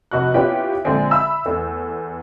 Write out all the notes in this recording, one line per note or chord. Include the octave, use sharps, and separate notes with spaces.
F1 F#4 F#6
B3 C#4 E4 F4 G4 G5
A#1 D3 G#3 C4 G#5
E5 B5 E6
E2 A3